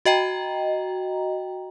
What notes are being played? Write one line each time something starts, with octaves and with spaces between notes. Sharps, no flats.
F#4 D#5 G5 A#5